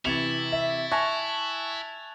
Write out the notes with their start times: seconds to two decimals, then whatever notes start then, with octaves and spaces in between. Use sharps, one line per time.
0.05 C3 E3 E4 C#6 G#6 A6 C#7 F7
0.52 E5
0.92 E5 G#5 A5 C#6 F#6 G#6 A#6 F7